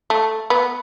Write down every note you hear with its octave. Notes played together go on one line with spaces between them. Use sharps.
A3
B3